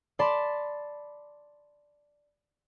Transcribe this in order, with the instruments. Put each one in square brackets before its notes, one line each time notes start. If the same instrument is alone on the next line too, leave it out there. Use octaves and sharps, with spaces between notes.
[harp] D5 A5 B5 C6 D6